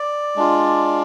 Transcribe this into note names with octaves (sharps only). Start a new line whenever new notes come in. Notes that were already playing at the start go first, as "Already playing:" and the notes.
Already playing: D5
G#3 D4 F4